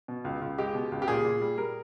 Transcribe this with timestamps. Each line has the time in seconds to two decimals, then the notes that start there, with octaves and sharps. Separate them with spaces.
0.08 B2
0.25 C#2
0.41 C#2
0.58 G#3 G4
0.75 B2
0.92 C#2
1.02 G4
1.08 A#2 G#4
1.25 A#2
1.41 G3
1.58 G3 A#4